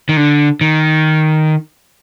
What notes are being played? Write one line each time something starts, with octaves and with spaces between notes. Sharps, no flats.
D#3
D3
D#3